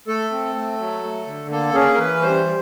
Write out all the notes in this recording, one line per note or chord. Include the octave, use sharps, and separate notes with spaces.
A3 A4
C4
A3
F#3
A3
D3
A#3 A4
C#4 G#4
A#4
E3 B4
G3 C5
G3